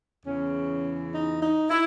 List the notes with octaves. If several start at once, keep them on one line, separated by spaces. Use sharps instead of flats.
E2 C#3 E3 C#4
D#4
D#4
E4